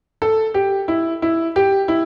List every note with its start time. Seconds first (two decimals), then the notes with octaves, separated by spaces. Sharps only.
0.22 A4
0.54 G4
0.88 E4
1.22 E4
1.56 G4
1.88 E4